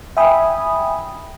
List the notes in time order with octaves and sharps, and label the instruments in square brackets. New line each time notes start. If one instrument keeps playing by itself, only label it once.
[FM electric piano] E5 G5 G#5 B5 D#6